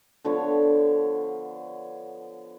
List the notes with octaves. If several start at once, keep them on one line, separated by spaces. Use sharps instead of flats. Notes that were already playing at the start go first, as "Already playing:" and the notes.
D3 F3 B3 C#5